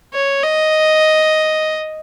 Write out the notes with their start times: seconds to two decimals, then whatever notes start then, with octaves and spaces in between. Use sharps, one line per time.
0.14 C#5
0.44 D#5